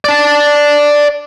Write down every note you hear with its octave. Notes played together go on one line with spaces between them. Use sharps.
D5 A5